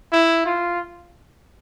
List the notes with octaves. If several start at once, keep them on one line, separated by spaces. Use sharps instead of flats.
E4
F4